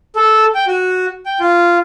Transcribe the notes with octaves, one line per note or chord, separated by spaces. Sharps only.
A4
G5
F#4
G5
F4